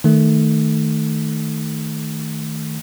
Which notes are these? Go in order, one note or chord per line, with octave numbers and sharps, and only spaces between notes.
D#3 A3